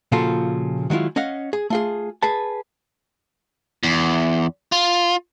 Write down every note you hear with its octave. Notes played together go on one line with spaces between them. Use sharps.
A#2 C#3 F3 F4 F#4 A4
D#3 F#3 G#3 E4 F4
C#4 D#5 F5 F#5
G#4
A3 F4 G#4
G#4 B4 A5
E2
F4